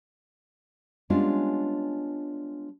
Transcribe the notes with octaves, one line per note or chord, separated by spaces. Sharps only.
G3 G#3 B3 C#4 D4 F4